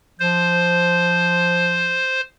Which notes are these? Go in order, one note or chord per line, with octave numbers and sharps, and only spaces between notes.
F3 C5